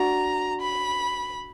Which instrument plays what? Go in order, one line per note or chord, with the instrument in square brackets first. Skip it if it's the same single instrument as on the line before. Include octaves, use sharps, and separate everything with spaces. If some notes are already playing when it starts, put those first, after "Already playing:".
Already playing: [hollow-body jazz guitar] D4 F#4 [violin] A#5
[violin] B5